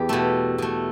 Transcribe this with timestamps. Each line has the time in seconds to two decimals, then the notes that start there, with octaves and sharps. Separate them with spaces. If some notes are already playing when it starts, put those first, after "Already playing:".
Already playing: E2 G4 G5
0.09 B2 A3
0.58 B2 A3